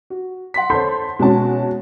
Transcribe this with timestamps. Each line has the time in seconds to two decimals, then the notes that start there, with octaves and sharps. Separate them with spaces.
0.10 F#4
0.54 F#5 C6 B6
0.70 A4 C5 C#5 A5 C6 G6
1.19 B2 G#3 C#4 F#4 A5